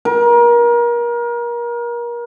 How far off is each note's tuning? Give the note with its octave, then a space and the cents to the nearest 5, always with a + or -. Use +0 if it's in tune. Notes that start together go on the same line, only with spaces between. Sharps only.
A#4 +30